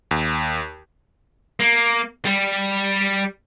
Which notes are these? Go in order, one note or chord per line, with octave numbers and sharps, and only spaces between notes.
D#2
A#3
G3